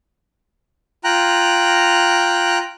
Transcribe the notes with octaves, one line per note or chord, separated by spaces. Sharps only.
F4 G5 A#5 F#6